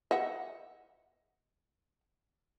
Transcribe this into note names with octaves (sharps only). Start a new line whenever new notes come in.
D#5 E5 F#5